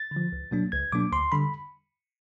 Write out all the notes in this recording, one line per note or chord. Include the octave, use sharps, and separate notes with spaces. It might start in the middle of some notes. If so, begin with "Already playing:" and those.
Already playing: A6
D3
F3
C#2
B2 F#3 A#3 D4
C#2 G#6
B2 F#3 A#3 D4 D6
D2 C6
D3 G3 B5